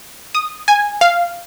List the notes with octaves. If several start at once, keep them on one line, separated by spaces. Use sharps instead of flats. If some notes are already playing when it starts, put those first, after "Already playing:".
D#6
G#5
F5